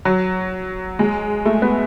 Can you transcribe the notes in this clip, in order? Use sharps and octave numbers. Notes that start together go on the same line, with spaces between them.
F#3
G#3
A3
B3